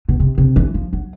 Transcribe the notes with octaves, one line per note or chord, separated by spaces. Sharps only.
B2
C3
C3
E3
F3
F#3